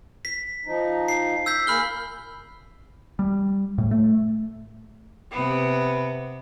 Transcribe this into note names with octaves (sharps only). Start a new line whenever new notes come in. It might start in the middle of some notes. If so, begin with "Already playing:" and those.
B6
F3 D#4
C7
E6 G6 B6
A#3 G#4 B5 F6 G7
G3
A2
A3
C3 B3